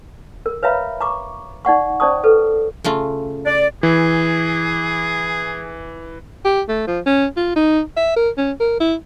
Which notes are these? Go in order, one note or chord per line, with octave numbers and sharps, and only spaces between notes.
A#4
B4 C#5 E5 F5 A#5 B5
A#5 C#6 D6
D#4 D5 F#5 C#6
C#4 C5 D5 A5 C#6 D#6
A4 B4
C#3 A3 F4
D5
E3 G#4
G4
A3
F3
C#4
F4
D#4
E5
A#4
C#4
A#4
E4